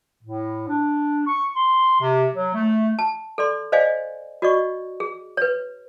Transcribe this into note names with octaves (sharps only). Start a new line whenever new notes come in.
A2
D4
C#6
C6
C3
F#3
A3
A5
A4 D5 C6
C5 D5 D#5 F5 G#5
F#4 D5 D#5 C#6
G#4
B4 C#5